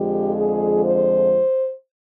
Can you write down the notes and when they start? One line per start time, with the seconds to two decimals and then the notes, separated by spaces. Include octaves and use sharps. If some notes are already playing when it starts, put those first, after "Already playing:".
Already playing: F2 D3 F3 G#3 G4
0.35 G#4
0.84 C5